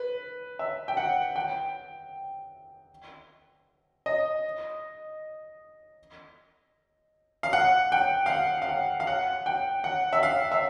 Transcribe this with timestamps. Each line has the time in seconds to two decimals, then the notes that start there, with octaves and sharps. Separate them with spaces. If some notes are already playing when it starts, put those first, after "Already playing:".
Already playing: B4
0.59 E5
0.88 G5
0.97 F#5
1.36 G5
4.06 D#5
7.43 F5
7.53 F#5
7.92 G5
8.26 F5
8.30 F#5
8.62 F5
8.69 F#5
9.00 F5
9.07 F#5
9.46 G5
9.84 F#5
10.13 E5
10.23 F5
10.52 E5